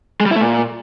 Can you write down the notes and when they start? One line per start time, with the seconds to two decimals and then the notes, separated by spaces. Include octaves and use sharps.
0.21 G#3
0.26 G3
0.31 E4
0.36 A3
0.41 A#2